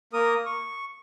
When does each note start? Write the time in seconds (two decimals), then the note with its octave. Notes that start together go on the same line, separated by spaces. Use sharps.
0.13 A#3 A#4 D#6
0.46 C#6